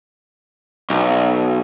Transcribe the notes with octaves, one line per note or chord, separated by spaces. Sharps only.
B1